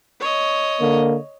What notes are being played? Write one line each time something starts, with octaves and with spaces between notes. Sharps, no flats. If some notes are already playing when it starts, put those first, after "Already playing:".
C#5 D#5
D3 A#3